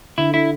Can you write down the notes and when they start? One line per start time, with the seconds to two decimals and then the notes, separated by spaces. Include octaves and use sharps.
0.18 D3 E4
0.34 E4